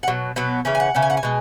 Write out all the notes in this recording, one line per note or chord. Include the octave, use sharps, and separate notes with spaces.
F#5
B2 F#3
B2 F#3 B3
C#3 E3 C#4
G#5
F#5
C#3 E3 C#4
G#5
F#5
G#5
B2 G#3